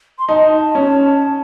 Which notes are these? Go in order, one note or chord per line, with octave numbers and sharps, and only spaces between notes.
C6
D#4 A5
C#4